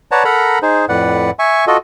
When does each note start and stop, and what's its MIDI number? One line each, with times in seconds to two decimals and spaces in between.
0.12 0.24 71
0.12 0.24 73
0.12 0.24 74
0.12 0.24 78
0.12 0.24 81
0.12 0.24 82
0.25 0.59 69
0.25 0.59 70
0.25 0.59 78
0.25 0.59 82
0.25 0.59 83
0.62 0.85 63
0.62 0.85 68
0.62 0.85 72
0.89 1.31 41
0.89 1.31 45
0.89 1.31 71
0.89 1.31 74
0.89 1.31 78
1.39 1.65 76
1.39 1.65 80
1.39 1.65 85
1.67 1.77 65
1.67 1.77 66
1.67 1.77 69
1.67 1.77 75